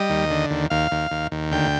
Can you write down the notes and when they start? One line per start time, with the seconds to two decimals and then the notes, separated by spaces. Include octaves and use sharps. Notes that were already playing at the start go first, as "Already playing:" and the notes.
Already playing: G3 D#5
0.10 D#2
0.30 D3
0.51 D#2
0.70 D#2 F5
0.92 D#2
1.11 D#2
1.32 D#2
1.51 D2 G5